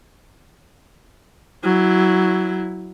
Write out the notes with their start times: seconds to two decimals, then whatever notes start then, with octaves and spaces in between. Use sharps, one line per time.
1.64 F#3 E4